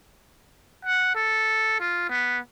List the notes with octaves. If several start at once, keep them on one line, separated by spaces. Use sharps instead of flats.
F#5
A4
F4
B3